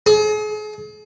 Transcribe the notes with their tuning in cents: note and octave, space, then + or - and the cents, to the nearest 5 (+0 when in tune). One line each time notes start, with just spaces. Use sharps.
G#4 +40